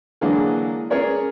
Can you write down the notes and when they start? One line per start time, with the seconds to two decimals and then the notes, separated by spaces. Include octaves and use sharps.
0.21 D3 E3 F#3 G#3 A#3 D4
0.90 C#4 G#4 A#4 C#5 D5